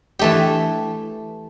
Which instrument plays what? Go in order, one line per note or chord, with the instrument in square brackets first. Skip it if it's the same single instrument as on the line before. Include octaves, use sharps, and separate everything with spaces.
[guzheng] E3 A3 G4